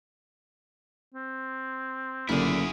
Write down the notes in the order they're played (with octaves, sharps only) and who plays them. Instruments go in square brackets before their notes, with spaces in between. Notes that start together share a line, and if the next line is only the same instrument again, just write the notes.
[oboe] C4
[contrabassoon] F#1 [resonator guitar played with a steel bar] A#2 D3 [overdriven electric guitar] E4 G#4 [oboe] B5